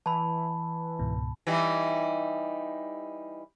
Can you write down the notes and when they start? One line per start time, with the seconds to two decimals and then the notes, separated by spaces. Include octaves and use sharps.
0.06 E3 A5 B5
0.99 C#2 G#2 B2
1.47 E3 G3 D#4